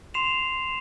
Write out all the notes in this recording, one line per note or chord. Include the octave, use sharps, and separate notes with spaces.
C6 C7 E7 F7